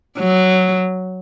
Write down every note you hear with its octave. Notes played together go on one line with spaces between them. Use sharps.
F#3